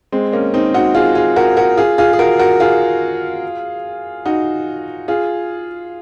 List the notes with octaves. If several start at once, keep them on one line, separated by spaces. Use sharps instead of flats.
G#3 C4
A#3 C#4
C4 D#4
D#4 F#4
F4 G#4
F4 G#4
F#4 A#4
F#4 A#4
F4 G#4
F4 G#4
G#4
F#4 A#4
F#4 A#4
F4 G#4
D#4 F#4
F4 G#4